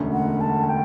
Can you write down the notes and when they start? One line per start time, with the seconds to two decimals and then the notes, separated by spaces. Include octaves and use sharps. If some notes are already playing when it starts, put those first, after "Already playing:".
Already playing: E1 D2 D3 A3 C#4
0.12 F#5
0.40 A5
0.63 F#5
0.69 G5